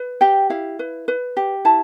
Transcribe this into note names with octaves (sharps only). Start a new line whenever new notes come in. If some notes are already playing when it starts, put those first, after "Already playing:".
Already playing: B4
G4 G5
E4 F5
B4
B4
G4
E4 A5